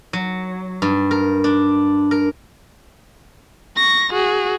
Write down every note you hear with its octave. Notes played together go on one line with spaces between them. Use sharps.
F#3
G2
A#4
D4
A#4
C#6 A#6
F#4 G#4